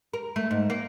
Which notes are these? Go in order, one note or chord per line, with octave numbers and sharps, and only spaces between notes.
A#4
A3
G#2
A#3